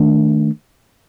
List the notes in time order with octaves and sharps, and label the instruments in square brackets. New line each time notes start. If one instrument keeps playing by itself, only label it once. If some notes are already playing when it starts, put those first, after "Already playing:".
Already playing: [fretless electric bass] D#3 A3 D4